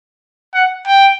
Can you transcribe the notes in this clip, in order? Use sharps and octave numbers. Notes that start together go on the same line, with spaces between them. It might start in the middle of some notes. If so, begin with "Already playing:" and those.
F#5
G5